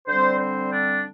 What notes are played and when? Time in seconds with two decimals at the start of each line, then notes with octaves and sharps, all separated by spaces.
0.08 D3 G3 C4 C5
0.40 C5
0.73 D4